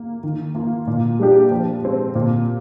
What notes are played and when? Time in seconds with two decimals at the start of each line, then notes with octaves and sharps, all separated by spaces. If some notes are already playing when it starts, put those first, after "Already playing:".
Already playing: A#3
0.23 D#3
0.55 A#3 F4
0.87 A#2
1.20 G3 D4 G4
1.51 F3
1.83 G#3 C4
2.15 A#2